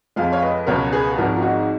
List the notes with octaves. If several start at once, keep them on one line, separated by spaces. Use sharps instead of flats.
F2 F3 G#3 F5
C#5 F5
B4 D#5
C#2 B2 F#3 A#4 C#5
G#4 B4
G#4
G#1 G#2 F3 F#4 A#4
F4
D#4 F#4